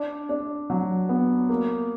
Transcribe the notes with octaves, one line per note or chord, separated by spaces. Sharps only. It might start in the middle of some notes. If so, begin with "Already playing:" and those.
Already playing: D4
D4
F#3
B3
A#3